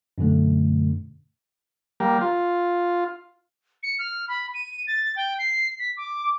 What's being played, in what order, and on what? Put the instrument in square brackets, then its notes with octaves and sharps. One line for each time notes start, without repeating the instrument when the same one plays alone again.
[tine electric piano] F#2 B2 D3 A3
[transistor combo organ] G3 A#3
F4
[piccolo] C#7
F6
B5
D#7
A6
G5
C7
B6
D6